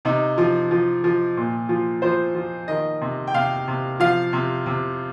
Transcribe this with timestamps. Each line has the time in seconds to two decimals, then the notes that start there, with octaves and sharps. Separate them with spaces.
0.05 C3 D#4
0.38 F3
0.71 F3
1.04 F3
1.37 A#2
1.69 F3
2.02 F3 C5
2.35 F3
2.68 D#3 D#5
3.01 C3
3.27 G5
3.34 C3 F5
3.67 C3
4.00 F3 F5
4.33 C3
4.66 C3